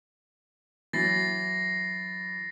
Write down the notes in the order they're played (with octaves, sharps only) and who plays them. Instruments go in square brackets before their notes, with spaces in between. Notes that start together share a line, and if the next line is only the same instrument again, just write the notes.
[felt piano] E3 F#3 [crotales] A6 A#6 C7